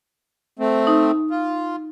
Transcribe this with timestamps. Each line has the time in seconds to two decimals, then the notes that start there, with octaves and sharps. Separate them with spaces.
0.59 A3 C4
0.87 D#4
1.31 F4